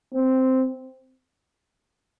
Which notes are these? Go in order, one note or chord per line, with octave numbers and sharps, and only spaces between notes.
C4